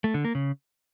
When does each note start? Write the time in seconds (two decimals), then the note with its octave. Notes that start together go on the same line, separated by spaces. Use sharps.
0.04 A3
0.14 D3
0.25 A#3
0.35 C#3